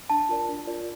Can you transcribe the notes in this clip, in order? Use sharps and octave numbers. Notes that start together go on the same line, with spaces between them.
D4 A5
F4 A#4 D5
D4
F4 A#4 D5